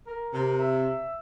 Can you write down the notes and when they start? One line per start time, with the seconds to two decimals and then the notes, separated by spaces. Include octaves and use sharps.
0.07 A#4
0.33 C3
0.59 E5